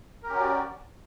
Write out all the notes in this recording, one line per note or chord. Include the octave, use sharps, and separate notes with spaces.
C#4 F#4 G4 A#4 D5